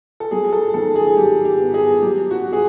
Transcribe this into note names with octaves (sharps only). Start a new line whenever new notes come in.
A4
F#3 G#4
A4
D#3 A4
G#4
G#4
F#3 G4
G4
B3
G#4
F#3 G4
F#4
G#4